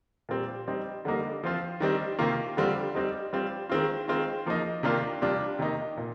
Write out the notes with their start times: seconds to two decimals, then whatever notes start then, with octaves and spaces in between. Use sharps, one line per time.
0.29 A#2 G3 C4
0.68 G3 C4 D#4
1.05 D3 G3 A#3 D#4
1.44 F3 C4 F4
1.80 D#3 G3 C4 D#4
2.19 C3 D#3 A#3 F4
2.57 D3 G3 C4 F4
2.95 G3 C4 D#4
3.33 G3 C4 F4
3.69 D#3 G#3 C4 F4
4.08 D#3 G#3 C4 F4
4.46 F3 A#3 D#4
4.83 C3 D#3 A#3 D4 F4
5.22 C3 G3 D4 F4
5.59 C3 D#3 A#3 D#4
5.97 A#2